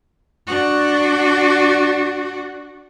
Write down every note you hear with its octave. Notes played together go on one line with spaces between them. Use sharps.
D4 F#4